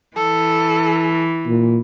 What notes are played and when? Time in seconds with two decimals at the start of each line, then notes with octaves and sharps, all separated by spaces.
0.17 E3 A4
1.47 A#2